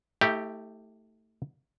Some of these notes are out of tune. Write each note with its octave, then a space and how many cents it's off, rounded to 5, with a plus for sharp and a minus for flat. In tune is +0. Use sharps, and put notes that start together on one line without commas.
A3 +15 E4 -45 G4 +0